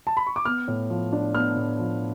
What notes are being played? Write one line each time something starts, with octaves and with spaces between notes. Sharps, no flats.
A5
B5
C#6
D6
B3 F6
A2
F3
D4
B3 F6
A2
F3